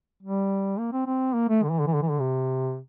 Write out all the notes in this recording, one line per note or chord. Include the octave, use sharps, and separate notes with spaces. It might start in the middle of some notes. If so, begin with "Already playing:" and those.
G3
A#3
C4
C4
A#3
A3
D3
E3
D3
E3
D3
E3
D3
C3